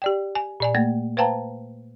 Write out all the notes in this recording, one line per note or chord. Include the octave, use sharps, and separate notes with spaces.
G4 D5 G5
G#5
A#2 D5 G#5
A3 A#3 G#6
B4 C5 F5 G5 A5 A#5